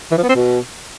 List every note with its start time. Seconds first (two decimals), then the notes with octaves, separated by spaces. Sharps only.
0.11 E3
0.17 F3
0.23 B3
0.29 C4
0.35 B2